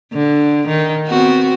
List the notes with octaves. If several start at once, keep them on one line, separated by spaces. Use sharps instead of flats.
D3
D#3
B3 C4 F#4